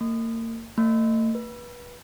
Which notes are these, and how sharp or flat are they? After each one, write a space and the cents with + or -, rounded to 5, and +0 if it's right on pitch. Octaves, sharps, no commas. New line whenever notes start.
A#3 -35
A3 +40
B4 -25